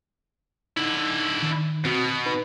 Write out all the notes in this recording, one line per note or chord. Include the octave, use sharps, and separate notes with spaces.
D3 D#4 E4
D#3
B2 C4 F#4 D#6
D#4 B4 B5